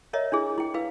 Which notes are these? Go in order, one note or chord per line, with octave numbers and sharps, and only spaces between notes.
A#4 C#5 D#5 E5 A#5
D4 E4 G#4
E4 G5
E4 B4 F5 E6